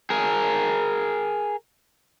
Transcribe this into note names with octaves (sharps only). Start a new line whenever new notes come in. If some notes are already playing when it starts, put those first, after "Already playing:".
G#4 A#4